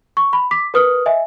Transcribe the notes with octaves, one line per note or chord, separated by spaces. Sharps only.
C#6
B5
D6 B6
A#4 B4 D#6 F6
D#5 E5 G#5